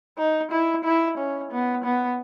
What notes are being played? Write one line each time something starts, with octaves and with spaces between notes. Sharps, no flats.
D#4
E4
E4
C#4
B3
B3